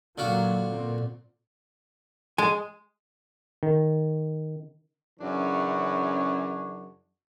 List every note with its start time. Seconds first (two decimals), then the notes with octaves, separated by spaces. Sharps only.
0.18 A#2 D3 F#3 F4 F#4
0.67 A#2 C4
2.38 G#3 G#5
3.63 D#3
5.20 F#2 C#3 E3 D4 F#4 C#5